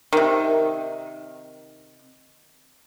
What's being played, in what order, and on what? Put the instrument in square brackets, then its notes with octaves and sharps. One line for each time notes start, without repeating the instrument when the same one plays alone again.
[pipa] C3 D#3